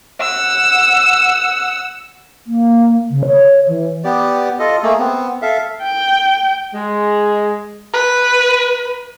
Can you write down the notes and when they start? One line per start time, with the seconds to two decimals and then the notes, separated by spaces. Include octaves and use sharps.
0.21 F#5 E6
2.47 A#3
3.10 C#3
3.26 C#5
3.68 E3
4.04 B3 G4 D5
4.59 F4 A4 D#5
4.83 A3 A#3 G#4
5.00 B3 C4
5.42 A4 E5 F5
5.83 G5
6.74 G#3
7.94 B4